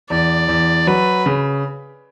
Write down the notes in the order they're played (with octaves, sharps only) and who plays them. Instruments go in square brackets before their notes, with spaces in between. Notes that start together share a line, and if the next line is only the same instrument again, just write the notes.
[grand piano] E2 [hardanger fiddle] D5
[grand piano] E2
[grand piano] F#3 [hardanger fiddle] B4
[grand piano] C#3